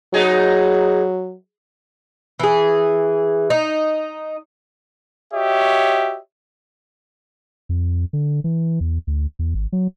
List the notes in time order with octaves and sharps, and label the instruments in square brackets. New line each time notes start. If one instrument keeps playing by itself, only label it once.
[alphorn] F#3 [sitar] B3 D#4 G#4
[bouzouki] E3 G#4
D#4
[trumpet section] F#4 G4 C#5 D#5 E5
[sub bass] F2
D3
E3
E2
D2
E2
G#1
F#3